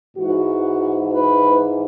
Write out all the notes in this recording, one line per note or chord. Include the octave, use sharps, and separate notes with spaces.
G#2 E3 F#4
B4